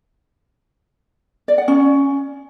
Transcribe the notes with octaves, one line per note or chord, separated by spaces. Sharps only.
D5
F#5
C#4